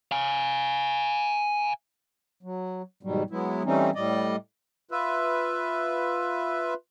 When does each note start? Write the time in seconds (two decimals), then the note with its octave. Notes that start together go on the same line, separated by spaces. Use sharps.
0.12 F5 G#5
2.43 F#3
3.03 D#2 G#2 B2 F#3 G3
3.30 F#3 G#3 B3 E4
3.65 E3 G3 A3 C4 C#4 D#4
3.95 A2 G3 D5 D#5
4.91 F4 B4 E5